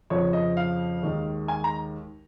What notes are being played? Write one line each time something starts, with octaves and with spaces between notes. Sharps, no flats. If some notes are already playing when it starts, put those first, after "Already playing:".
F2 C#3 F3 C#5
D#5
F5
D#2 D#3 G#3
G#5
A#5